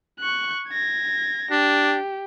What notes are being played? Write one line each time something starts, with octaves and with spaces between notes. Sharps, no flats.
C#6 F#6
G#6 A#6
D4 G4